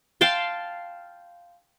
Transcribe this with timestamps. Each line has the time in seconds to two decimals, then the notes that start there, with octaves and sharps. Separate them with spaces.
0.21 F5 G5 A5 C6